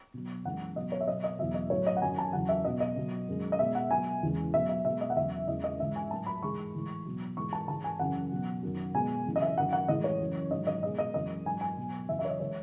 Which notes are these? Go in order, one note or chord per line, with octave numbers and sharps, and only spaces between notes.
B2 F#3
F#2 E3 G#3 F#5
B2 F#3 D#5
C#5
E5
B2 F#3 D#5
D#5
E2 B2 F#3 E5
D#5
A2 F#3 C#5
D#5
F#5
F#2 D#3 F#3 G#5
A5
E2 C#3 F#3 F#5
E5
B2 F#3 D#5
D#5
B2 F#3
F#2 D#3 G#3
D#5
B2 G#3 E5
F#5
B2 F#3 G#5
E2 C#3 E3 G#3
B2 F#3 E5
E5
B2 G#3 E5
D#5
F#5
E2 C#3 F#3 E5
E2 C#3 E3 G#3 D#5
D#5
G#2 E3 G#3 E5
G#5
A2 F#3 A5
B5
G#2 E3 G#3 C#6
A2 E3 G#3
B2 F#3
G#2 E3 G#3 C#6
A5
G#2 E3 G#3 A5
G#5
F#2 C#3 E3 F#5
B2 F#3
F#2 D#3 F#3
B2 G#3 G#5
F#2 C#3 E3
D#5
E5
F#2 D#3 F#3 F#5
F#5
A2 E3 G#3 D#5
C#5
F#2 C#3 E3
G#2 D#3 F#3 D#5
D#5
B2 G#3 D#5
D#5
F#2 E3 G#3 D#5
G#2 F#3 G#5
G#5
B2 F#3
F#2 C#3 E3 E5
E5
C#5
D#5
E3 G#3 C#5